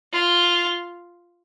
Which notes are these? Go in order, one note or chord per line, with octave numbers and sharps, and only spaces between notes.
F4